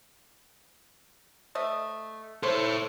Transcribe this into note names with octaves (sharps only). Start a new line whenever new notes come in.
A3 D#5 E5
A4 C5 C#5